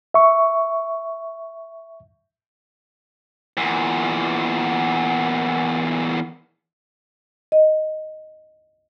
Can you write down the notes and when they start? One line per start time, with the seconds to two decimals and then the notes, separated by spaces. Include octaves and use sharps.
0.14 E5 C#6
3.57 E2 A#2
7.52 D#5